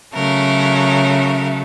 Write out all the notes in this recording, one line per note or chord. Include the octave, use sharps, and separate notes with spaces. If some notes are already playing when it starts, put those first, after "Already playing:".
C#3 F#3 A3 A#4